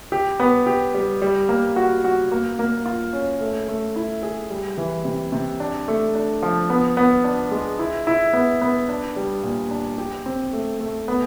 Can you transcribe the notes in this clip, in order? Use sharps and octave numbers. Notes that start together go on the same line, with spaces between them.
G4
B3
G4
G3
G3
A#3
F#4
F#4
A#3
A#3
F4
C#4
A3
A3
E4
G#4
G3
E3
C3
C3
D4
A3
D4
F3
B3
B3
D4
G#3
E4
E4
B3
B3
D4
G3
A#2
D4
G4
C4
A3
A3
B3